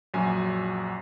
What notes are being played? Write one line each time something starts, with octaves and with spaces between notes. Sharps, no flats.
A#1 F#2 F#3 G#5